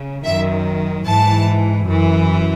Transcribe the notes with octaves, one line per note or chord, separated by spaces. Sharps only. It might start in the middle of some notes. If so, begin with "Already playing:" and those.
Already playing: C#3
F#2 D#3 F#3 E5
G#2 E3 A5
F#2 E3